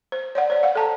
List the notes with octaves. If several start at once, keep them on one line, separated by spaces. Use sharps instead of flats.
C5
C#5 D5 F#5
C5 D5
F5 F#5
A4 A5 A#5